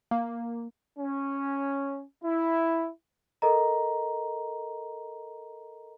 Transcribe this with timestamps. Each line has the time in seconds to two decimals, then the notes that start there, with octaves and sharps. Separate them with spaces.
0.11 A#3
0.99 C#4
2.24 E4
3.42 A4 A#4 D#5 A#5